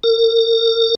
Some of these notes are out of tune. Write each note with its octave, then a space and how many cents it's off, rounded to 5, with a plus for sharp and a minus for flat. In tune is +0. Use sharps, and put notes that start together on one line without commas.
A#4 -35